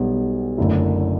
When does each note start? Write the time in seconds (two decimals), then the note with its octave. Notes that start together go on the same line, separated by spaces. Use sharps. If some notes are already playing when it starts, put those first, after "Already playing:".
Already playing: B1 B2 G3 B3
0.58 F#1 F#2 D3 A3 E4